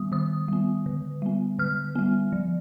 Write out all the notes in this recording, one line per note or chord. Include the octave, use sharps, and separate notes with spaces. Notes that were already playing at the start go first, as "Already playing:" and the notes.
Already playing: D#3 G3 B3 D#6
D#3 D#6
G3 B3
D3
G3 B3
D3 F6
G3 B3
F3